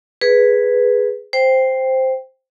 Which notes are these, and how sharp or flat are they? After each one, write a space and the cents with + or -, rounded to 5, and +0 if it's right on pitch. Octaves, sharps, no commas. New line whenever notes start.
G#4 +0 B4 +0
C5 +0 G5 +0